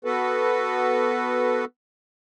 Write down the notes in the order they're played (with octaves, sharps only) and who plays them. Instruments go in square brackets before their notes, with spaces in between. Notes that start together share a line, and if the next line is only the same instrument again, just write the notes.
[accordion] B3 F#4 A4 B4